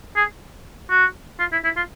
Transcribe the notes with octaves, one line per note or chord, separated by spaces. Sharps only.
G#4
F#4
F4
E4
E4
F4